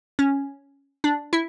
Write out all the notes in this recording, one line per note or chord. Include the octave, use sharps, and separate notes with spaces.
C#4
D4
E4